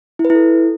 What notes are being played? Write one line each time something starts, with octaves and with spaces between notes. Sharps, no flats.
E4
B4
E4
A4